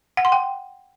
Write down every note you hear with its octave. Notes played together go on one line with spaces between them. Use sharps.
F#5
C6
G5